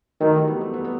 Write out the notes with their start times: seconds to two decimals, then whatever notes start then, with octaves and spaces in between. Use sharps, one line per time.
0.20 D#3 F#3 A3
0.34 E3 G3
0.47 G3 B3
0.61 A3 C4
0.74 G3 B3
0.85 B3